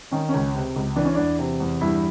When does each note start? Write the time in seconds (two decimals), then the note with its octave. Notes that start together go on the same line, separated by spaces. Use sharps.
0.12 D#3 C#4
0.29 C#4
0.34 C#2
0.55 C3
0.76 C#2
0.96 E3 D4
1.05 C#4
1.15 E2 D4
1.39 C3
1.60 E2
1.81 G2 E4